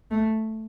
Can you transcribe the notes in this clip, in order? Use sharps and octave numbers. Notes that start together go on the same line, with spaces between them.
A3